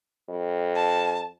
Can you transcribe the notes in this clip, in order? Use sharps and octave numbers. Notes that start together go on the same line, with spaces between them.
F2
A5